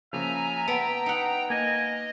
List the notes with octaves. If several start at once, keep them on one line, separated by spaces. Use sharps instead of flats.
C#3 F3 A#3 E5 G#5 A#5
B3 G5 A5 A#5
D#4 F#5
A#3 D#5 G#5